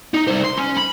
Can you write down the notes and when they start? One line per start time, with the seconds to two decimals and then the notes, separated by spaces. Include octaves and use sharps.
0.14 D#4
0.28 C2 C5
0.44 C6
0.58 C#4
0.77 B5